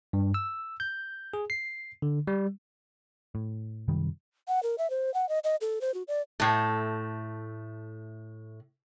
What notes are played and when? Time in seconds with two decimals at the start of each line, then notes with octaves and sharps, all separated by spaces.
0.13 G2
0.34 E6
0.80 G6
1.34 G#4
1.50 C7
2.02 D3
2.27 G3
3.35 A2
3.88 F#2 C3 D#3 G3
4.48 F#5
4.63 A#4
4.78 E5
4.90 C5
5.14 F#5
5.29 D#5
5.44 D#5
5.61 A4
5.81 C5
5.94 F#4
6.08 D5
6.40 A2 A3